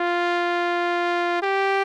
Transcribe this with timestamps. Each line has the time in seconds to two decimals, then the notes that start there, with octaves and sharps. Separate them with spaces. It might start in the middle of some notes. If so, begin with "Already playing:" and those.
Already playing: F4
1.42 G4